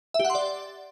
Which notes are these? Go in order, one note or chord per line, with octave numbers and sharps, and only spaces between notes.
E5
G4
F#5
C6
D5